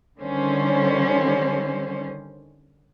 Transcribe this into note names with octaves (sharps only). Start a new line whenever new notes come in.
D3 D#3 G3 C#4 C5